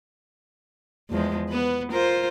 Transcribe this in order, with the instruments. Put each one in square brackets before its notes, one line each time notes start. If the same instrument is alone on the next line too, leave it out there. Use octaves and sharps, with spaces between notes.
[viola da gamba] E2 F3 G#3
B3 B4
F4 A#4 C5